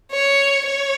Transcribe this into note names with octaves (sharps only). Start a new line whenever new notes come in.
C#5
C#5